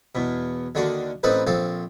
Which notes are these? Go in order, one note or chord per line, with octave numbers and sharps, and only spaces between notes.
E2 B2
D#2 D3 D4 F#4
A1 C4 D#4 A4 B4 C5
A#1 C4 A4 F5